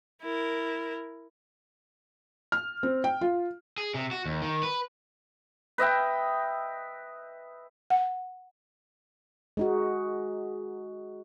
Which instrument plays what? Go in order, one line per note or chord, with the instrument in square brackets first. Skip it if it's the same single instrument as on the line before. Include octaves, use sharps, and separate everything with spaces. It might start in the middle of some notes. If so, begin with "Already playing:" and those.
[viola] E4 A#4
[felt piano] F6
C4
G5
F4
[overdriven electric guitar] G#4
C3
F#4
D#2
D#3
B4
[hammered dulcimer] B4 D#5 E5 G5
[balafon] F#5
[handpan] G#3 D#4 F#4